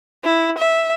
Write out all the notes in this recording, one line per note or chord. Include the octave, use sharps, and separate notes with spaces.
E4
E5